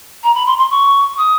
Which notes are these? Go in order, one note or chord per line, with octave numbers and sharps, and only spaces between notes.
A#5
B5
C6
C6
C#6
D#6